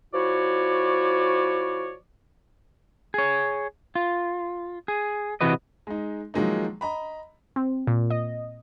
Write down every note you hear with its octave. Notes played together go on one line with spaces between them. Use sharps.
F3 E4 F#4 C#5 D5
G#4 C#5
F4
G#4
C3 E3 F#4 B4 D#5
G#3 D#4
D#3 F3 F#3 G#3 A#3 D#4
D#5 A#5 B5
C4
A#2
D#5